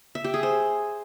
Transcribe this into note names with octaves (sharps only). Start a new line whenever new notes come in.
E5
G4
G#4
C5